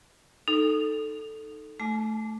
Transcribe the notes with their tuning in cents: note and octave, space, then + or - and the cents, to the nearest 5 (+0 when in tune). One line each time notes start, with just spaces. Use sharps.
D#4 -5 A4 +0
A3 -5 G#5 +35 D6 -5